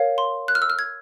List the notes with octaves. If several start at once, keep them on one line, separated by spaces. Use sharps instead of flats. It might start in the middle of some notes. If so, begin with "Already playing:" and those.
Already playing: A#4 C#5 F5
C6
F#6
F6
E6
F6
G#6